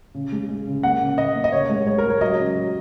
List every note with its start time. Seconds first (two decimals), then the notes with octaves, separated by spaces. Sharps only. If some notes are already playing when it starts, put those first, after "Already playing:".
0.15 C#3
0.32 G#3
0.49 G#3
0.67 C#3
0.83 A#3 F#5
1.01 C#3
1.18 C#3 D#5
1.35 A#3
1.44 D#5
1.52 C#3 C#5
1.70 G#3
1.86 G#3 C#5
1.98 A#4
2.04 G#3
2.10 C#5
2.21 F#3 D#5
2.39 C#3
2.56 F#3